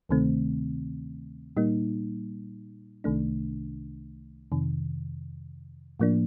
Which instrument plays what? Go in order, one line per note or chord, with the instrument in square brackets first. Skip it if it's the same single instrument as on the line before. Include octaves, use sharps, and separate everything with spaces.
[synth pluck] D2 C3 D#3 A3 C4
A#2 G3 A#3 D#4
C2 C3 D#3 A3 D4
F2 C3 D#3
A2 F3 A#3 D4